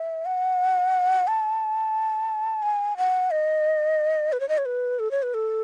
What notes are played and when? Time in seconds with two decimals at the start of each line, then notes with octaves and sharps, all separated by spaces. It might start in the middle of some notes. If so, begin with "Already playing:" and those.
Already playing: E5
0.26 F#5
1.27 A5
2.62 G#5
2.97 F#5
3.31 D#5
4.33 B4
4.40 C#5
4.49 D#5
4.58 C#5
4.66 B4
4.99 A4
5.11 C#5
5.23 B4
5.34 A4